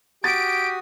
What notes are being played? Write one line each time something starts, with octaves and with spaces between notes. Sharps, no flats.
F#4 G4 D#6 A6 D7